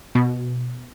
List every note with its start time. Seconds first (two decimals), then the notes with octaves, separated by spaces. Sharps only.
0.15 B2